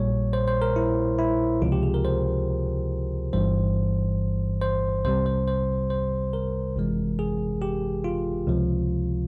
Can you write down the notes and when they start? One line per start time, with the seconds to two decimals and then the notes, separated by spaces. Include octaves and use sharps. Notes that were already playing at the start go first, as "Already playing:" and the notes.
Already playing: A#1 A#2 G3 C#5
0.33 C5
0.48 C5
0.62 A#4
0.76 E4
1.19 E4
1.62 C#2 C3 F3 F4
1.72 G4
1.83 G#4
1.94 A#4
2.05 C5
3.33 G1 G2 E3 G3 C5
4.62 C5
5.05 C2 C3 G3 C5
5.26 C5
5.48 C5
5.90 C5
6.33 A#4
6.76 G1 F2 C3 E3 G#3
7.19 G#4
7.62 G4
8.04 F4
8.47 C#2 C3 F3